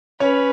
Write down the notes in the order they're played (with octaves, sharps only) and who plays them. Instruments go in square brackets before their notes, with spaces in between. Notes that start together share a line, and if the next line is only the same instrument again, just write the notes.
[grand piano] C#4 C#5 [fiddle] B4